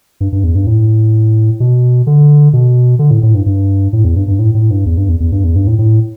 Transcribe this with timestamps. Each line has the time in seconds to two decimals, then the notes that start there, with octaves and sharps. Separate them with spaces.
0.21 G2
0.32 G2
0.44 E2
0.55 G2
0.67 A2
1.60 B2
2.07 D3
2.53 B2
2.99 D3
3.11 A2
3.23 A2
3.35 G2
3.46 G2
3.93 A2
4.04 E2
4.16 G2
4.28 G2
4.39 A2
4.55 A2
4.70 G2
4.86 E2
4.97 G2
5.09 E2
5.20 E2
5.32 G2
5.44 E2
5.56 G2
5.67 A2
5.79 A2